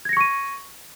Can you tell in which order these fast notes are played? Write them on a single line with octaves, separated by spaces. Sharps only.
G#6 A#6 C#7 C#6 D#7